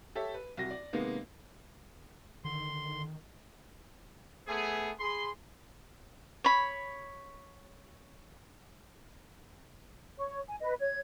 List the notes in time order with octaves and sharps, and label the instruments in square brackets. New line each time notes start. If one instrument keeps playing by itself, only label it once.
[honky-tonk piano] G4 A4 C#5 E5
B4
C2 F#4 A#6
D5
C3 D#3 G#3 A#3 B3
[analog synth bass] D3 [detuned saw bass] D#3 [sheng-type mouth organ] C6
[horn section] A3 B3 G#4
G#4 B5 C6
[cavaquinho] C#5 B5
[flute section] C#5 C#6
G#5
B4 D#5
C#5 G#6